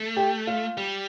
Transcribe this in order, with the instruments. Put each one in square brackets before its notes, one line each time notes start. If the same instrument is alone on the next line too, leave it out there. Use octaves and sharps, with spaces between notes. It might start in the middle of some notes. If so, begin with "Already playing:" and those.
Already playing: [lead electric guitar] A3
[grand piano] G4
F4
[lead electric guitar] G3